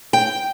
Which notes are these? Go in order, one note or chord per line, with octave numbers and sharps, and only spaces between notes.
G5